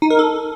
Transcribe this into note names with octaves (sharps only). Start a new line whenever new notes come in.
D#4
A#4
A4